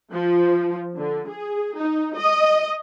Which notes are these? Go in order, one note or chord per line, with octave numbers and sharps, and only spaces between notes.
F3
D3
G#4
D#4
D#5